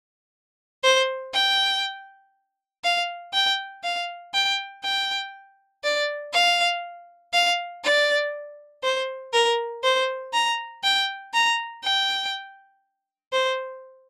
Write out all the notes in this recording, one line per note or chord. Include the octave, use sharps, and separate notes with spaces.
C5
G5
F5
G5
F5
G5
G5
D5
F5
F5
D5
C5
A#4
C5
A#5
G5
A#5
G5
C5